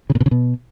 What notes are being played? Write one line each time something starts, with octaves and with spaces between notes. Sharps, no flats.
C#3
A#2
B2
C#3
B2